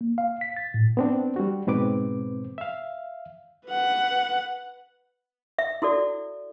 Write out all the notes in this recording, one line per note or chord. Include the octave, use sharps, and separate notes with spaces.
A#3
F5
B6
A6
A2
B3 C4 D4
G3 F#4
G#2 B2 C4 B4 D6
E5 F5
B4 F#5
E5
E4 F#4 A4 D5